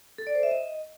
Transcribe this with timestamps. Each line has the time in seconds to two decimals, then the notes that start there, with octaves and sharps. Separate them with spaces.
0.18 A4
0.27 D5
0.35 C5
0.43 E5
0.51 D#5